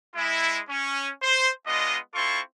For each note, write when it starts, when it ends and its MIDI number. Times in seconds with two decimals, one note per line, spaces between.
0.16 0.60 56
0.16 0.60 64
0.70 1.10 61
1.23 1.50 72
1.66 1.98 56
1.66 1.98 59
1.66 1.98 62
1.66 1.98 65
1.66 1.98 75
2.15 2.40 60
2.15 2.40 64
2.15 2.40 65
2.15 2.40 69
2.15 2.40 84
2.15 2.40 85